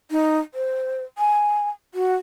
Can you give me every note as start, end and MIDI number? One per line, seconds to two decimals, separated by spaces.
0.11 0.38 63
0.54 1.04 72
1.18 1.69 80
1.94 2.15 66